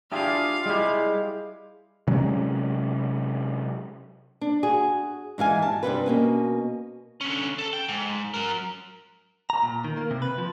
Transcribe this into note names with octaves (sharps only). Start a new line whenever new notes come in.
D4 E4 F4 G4 G#4 F5
G3 G#3 E4 G4 G#4
C3 F#3 G#3 C#4
D4
F#4 G#4
G#2 E3 F5 G#5
G3 A5
G2 C3 G3 B4
B2 A#3 C#4
D3 C#4
A4
G5
G#2
F#3 A#4
A#5
A#2
D#3
A#3
C3
B4
F3